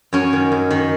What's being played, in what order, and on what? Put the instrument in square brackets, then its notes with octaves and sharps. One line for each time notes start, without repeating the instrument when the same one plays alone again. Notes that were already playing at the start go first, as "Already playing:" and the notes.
[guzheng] F#2 C#4
D#3
F#2
D#3